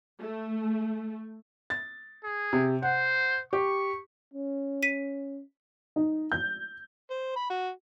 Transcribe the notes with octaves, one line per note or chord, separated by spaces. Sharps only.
A3
A6
G#4
C3
C5 F#5
G4 C#6
C#4
B6 D#7
D#4
G6
C5
B5
F#4